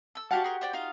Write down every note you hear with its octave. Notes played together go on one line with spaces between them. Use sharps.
A4 E6
D4 F#4 G4 F5 F#5 A5
G#4 A#4 C6
C5 D5 G5
D#4 F4 F5